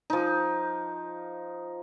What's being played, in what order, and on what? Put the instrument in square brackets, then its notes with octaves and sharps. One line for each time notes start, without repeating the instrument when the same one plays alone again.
[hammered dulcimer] F3 D#4